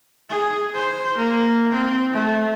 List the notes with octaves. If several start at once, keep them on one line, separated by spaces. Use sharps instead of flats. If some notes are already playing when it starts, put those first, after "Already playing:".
G#4
C5
A#3
C4
A3